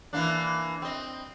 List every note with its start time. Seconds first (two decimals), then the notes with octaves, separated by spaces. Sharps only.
0.13 E3 A#3 D4
0.82 C4 D#5